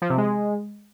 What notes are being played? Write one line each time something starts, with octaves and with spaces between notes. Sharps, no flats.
F3
C3
G#3